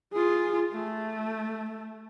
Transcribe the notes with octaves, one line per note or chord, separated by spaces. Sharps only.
F4 G#4
A3